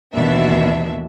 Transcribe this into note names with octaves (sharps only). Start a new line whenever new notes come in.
A1 D#2 B2 E3 D4 E5